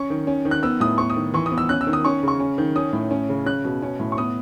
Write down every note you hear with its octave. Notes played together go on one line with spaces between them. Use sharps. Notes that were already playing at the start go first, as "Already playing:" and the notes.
Already playing: C#4 C#6
D#3
C#4
D#3
F#6
B3 E6
A2 D#6
B3 C#6
D#6
D#3
E3 C#6
D#6
B3
E6
C#4 F#6
E6
D#3
D#6
C#4 C#6
C#3 C#6
C#4
D#3
C#4 D#6
A2
C#4
C#3
C#4 F#6
B2
C#4
A2
C#6
B3 D#6